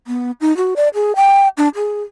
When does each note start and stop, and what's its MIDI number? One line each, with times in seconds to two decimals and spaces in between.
0.07 0.31 59
0.41 0.55 63
0.57 0.74 66
0.76 0.88 74
0.94 1.12 68
1.16 1.48 79
1.57 1.69 62
1.75 2.03 68